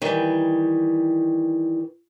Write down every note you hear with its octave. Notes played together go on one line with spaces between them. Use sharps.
D#3 E3 G3